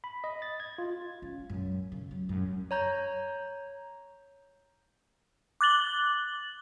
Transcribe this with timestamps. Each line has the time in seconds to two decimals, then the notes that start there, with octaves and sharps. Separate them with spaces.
0.04 B5
0.24 D#5
0.42 A6
0.60 G#6
0.78 F4
1.22 C#4
1.50 F#2
1.92 C#3
2.11 F#3
2.29 F#2
2.71 C#5 A#5 G6
5.61 D6 F#6 A6 F#7 G7